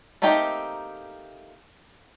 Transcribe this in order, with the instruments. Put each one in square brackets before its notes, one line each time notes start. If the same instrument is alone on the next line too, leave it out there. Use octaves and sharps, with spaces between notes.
[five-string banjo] A3 A#3 C4 D#4 G4